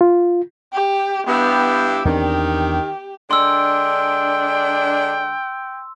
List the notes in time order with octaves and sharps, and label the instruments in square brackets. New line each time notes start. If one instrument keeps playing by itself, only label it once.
[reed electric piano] F4
[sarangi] G4
[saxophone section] G2 E4 G4 [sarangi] B3
[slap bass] E2 C4 D4 [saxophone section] D#3 [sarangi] G4
[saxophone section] D3 G#3 D4 [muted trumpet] G5 [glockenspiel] C6 E6